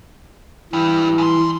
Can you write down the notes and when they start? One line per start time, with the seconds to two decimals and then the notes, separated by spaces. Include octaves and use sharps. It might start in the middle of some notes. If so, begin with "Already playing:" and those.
0.73 G2 E3 G3
1.18 G#2 C6